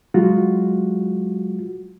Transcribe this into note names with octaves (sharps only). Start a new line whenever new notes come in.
F#3 G#3 F4 F#4